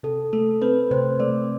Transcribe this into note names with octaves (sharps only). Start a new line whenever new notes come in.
C3 A4
A3 A4
C4 B4
C3 C5
A3 D5